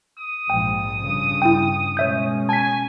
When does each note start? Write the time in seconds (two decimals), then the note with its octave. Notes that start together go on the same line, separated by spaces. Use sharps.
0.18 D#6
0.50 A#1 G#2 F3 G5
1.01 G2 C#3
1.42 E4 G5
1.97 B2 G#3 C#4 C#5 E5 G6
2.49 G#5 A5 B6